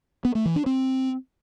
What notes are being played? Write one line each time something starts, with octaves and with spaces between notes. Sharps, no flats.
B3
A3
E3
D4
C4